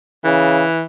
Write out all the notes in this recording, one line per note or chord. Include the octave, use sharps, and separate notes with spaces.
C#3 E3